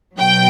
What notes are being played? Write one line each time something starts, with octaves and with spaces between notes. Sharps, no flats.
B2 F#3 G5